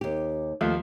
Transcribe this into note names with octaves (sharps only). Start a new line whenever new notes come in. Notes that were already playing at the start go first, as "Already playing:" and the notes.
D#2 G4
D#2 F3 A3